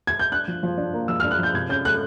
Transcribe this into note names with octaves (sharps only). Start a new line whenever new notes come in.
G#6
G6
D4 F#6
F3
F3
D4
A#3
F3 E6
D4 F6
F#6
F3 G6
C3 G#6
C#4 G6
A3 F#6